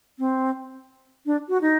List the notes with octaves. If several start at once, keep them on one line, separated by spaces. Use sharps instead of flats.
C4
D4
F#4
D#4